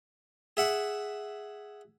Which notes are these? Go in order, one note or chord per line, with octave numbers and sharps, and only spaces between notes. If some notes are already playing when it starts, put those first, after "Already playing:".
G#4 E5 F#5